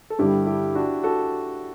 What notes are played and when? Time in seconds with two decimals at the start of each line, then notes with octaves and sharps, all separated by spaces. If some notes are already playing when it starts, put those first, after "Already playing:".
0.10 A4
0.19 G2 D3 G3 E4 G4
0.46 E4 G4
0.75 D4 F#4
1.03 F#4 A4